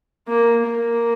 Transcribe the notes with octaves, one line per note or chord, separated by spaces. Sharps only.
A#3
A#3